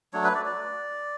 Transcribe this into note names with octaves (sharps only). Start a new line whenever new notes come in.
F#3 A3 D4 C#5
B4
D5
D5